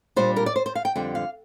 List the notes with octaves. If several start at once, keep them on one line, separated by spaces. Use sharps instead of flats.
A#2 G3 D4 C5
A#4
D5
C5
C5
F5
G5
F2 D3 G3 G5
F5